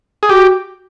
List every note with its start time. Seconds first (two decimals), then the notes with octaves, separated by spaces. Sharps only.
0.23 G#4
0.29 F#4 G4